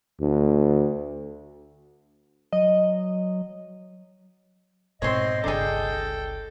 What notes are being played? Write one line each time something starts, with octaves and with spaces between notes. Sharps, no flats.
D2
F#3 D#5
G#2 B2 C4 C5 C#5 D#5 C6
G1 C#2 D4 G#4 A4 G5